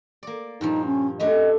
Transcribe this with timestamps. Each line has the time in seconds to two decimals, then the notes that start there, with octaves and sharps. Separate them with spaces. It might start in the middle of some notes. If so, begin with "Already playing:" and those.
0.23 A#3 D5
0.61 G2 A#2 F3 D#4
0.86 C#4
1.20 F#2 A3 D4 D#5